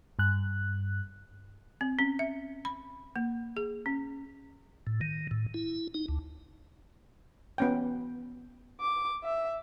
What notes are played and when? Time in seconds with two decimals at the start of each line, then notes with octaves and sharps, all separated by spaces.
0.19 G2 F#6
1.81 C4
1.99 C#4
2.19 E5
2.65 B5
3.16 A#3
3.57 G#4
3.86 C#4
4.87 A2
5.01 D#3
5.31 A2
5.54 E4
5.94 D#4
6.08 D2
7.58 B3 C#4 G5
8.80 D6
9.24 E5